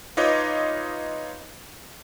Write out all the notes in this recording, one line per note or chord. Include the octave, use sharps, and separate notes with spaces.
D#4 F4 B4 C#5 D#5 D6